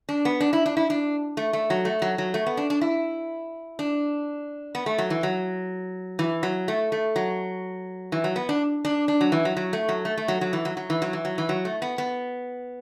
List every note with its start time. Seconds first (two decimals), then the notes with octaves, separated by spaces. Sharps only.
0.09 D4
0.25 B3
0.40 D4
0.53 E4
0.66 D4
0.77 E4
0.90 D4
1.37 A3
1.53 A3
1.70 F#3
1.85 A3
2.02 F#3
2.18 F#3
2.34 A3
2.46 B3
2.57 D4
2.70 D4
2.81 E4
3.79 D4
4.75 B3
4.86 A3
4.98 F#3
5.10 E3
5.23 F#3
6.19 E3
6.43 F#3
6.68 A3
6.92 A3
7.16 F#3
8.12 E3
8.24 F#3
8.36 B3
8.49 D4
8.85 D4
9.08 D4
9.21 F#3
9.32 E3
9.45 F#3
9.57 F#3
9.73 A3
9.89 F#3
10.05 A3
10.17 A3
10.28 F#3
10.41 F#3
10.53 E3
10.65 F#3
10.77 F#3
10.90 E3
11.02 F#3
11.13 E3
11.25 F#3
11.38 E3
11.49 F#3
11.65 A3
11.82 B3
11.98 B3